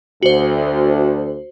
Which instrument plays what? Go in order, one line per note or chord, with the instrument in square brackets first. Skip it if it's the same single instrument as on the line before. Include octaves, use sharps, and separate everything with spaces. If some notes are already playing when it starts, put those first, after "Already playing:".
[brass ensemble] D2 [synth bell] F#4 C5